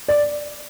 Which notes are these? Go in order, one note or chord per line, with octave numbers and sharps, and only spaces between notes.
D5